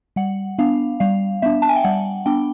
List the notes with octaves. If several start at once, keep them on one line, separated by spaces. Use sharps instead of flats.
G3 F#5
B3 D4 F5
G3 F5
B3 D4 E5
A5
G#5
G5
G3 F#5
B3 D4 G5